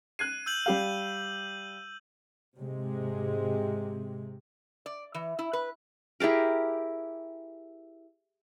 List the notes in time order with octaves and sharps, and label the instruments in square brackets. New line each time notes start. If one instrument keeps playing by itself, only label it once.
[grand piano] F#6 G#6 C7 [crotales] D#7
[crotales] E6 G6 F#7
[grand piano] G3 G4 F5
[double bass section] G#2 C3 G#3
[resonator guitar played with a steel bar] D5
E3
E4
B4
[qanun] E4 G4 G#4 A#4